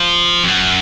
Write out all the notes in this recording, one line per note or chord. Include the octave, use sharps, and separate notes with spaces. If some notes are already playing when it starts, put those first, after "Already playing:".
Already playing: F3
F2
F#2